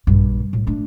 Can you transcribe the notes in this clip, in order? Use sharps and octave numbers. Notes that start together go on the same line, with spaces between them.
A#1 G2
A2
A3 D4